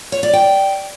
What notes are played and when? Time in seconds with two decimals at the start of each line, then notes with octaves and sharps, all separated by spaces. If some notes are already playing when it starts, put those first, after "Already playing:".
0.12 C#5
0.23 D5
0.33 G5